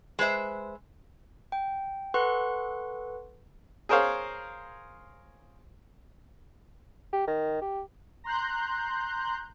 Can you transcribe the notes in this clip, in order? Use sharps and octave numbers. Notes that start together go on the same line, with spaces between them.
G#3 B4 C5 E5
G5
A4 B4 F#5 C6 C#6 F#6
G#4 A#4 C5 C#5 F5
G4
D#3
G4
A#5 C6 F#6 G6